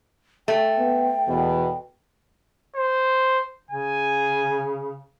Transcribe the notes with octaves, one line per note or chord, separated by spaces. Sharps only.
A3 G5
B3
E2 B2
C5
C#3 G#5